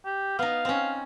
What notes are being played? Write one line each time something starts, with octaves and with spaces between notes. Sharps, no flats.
G4
B3 D#4 F5
C4 C#4